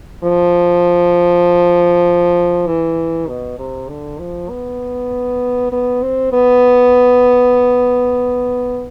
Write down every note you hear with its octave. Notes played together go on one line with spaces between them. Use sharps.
F3
E3
B2
C3
D3
F3
B3
B3
C4
B3